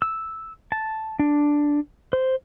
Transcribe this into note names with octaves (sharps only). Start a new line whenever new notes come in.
E6
A5
D4
C5